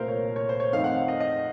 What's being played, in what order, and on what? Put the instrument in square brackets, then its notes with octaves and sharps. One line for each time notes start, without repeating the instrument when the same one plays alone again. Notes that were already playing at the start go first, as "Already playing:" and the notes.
Already playing: [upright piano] C2 A#2 A3 A#4 C5 F5
C#5
C#5
C5
C#5
F2 D#3 A3 C4 D#4 F5
F#5
F5
D#5
D#5